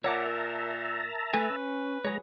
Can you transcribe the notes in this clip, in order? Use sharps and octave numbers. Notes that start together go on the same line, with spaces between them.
A#2 C#5 E5 F#5 A5 A#5 D6
A#4
A3 A4 B4 G#5
C#4
F#3 G#3 G#4 C#5 A#5